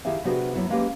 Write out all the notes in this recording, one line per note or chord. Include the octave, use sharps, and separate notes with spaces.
D#3 E4 G4 G#4 E5 F5
C3 B3 D4 F#4 G#4 B4
F#3 B3 E4
G#3 A#3 C#4 G4 B4